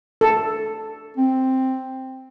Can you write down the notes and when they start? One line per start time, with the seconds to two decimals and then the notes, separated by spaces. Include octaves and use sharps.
0.21 A4
1.17 C4